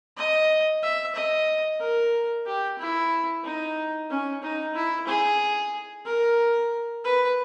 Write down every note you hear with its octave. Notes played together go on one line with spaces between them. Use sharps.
D#5
E5
D#5
A#4
G4
E4
D#4
C#4
D#4
E4
G#4
A#4
B4